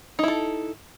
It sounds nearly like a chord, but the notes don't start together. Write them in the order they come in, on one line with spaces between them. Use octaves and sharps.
D#4 E4 A4